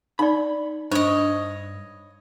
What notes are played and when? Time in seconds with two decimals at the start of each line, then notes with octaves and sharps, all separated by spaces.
0.19 D#4 D5 B5
0.91 G2 D4 C5 C#5 D#5